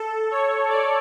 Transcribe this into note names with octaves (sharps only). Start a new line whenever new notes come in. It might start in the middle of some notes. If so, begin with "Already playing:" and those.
Already playing: A4
C#5
D5